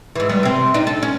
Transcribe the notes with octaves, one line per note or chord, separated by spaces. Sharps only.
G#2 E3
E2 G3 B3
C3 C4
D4 D#4
A4
C#4